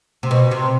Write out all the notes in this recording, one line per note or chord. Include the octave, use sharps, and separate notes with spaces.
C3
B2
C3